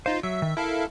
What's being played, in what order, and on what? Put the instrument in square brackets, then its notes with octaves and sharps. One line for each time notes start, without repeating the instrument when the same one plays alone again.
[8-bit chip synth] D#4 F4 [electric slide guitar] C5
[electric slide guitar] F#3 [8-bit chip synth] E5
[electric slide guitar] D#3
[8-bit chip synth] E4 A4 F5 [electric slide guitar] A#4